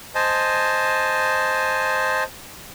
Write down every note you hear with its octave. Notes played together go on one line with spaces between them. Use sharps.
C5 D#5 G#5 A5